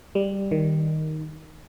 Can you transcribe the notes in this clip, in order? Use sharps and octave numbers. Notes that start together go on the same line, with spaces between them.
G3
D#3